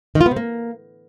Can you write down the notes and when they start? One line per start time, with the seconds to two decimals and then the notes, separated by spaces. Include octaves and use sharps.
0.15 D#3
0.21 F4
0.26 B3
0.31 C3
0.36 A#3